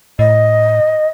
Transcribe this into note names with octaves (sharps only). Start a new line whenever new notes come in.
A2 D#5